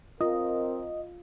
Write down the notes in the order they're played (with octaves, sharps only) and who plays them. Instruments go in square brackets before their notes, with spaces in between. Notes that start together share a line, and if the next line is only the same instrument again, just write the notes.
[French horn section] C4 A#4 [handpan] F4 [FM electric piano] D#5